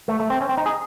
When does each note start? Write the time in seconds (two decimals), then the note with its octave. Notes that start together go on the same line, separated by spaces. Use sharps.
0.08 A3
0.20 A3
0.30 C4
0.41 C#4
0.49 C4
0.57 D#4
0.66 G#4